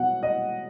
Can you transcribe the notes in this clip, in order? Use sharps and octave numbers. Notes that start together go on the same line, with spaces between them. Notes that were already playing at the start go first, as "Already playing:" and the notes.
Already playing: B2 F#3 F#5
D#5